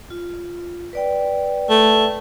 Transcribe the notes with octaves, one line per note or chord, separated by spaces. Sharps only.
F4
B4 D5 G5
A3